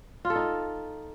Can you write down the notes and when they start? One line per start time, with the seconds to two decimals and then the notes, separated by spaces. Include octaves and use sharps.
0.25 F4
0.30 A4
0.35 D#4